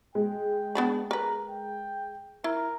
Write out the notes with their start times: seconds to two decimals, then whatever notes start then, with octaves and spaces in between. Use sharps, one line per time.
0.15 G#3 G5
0.75 B3 D4 B5
1.11 A#4 B4 A#5
1.49 G5
2.44 E4 A#4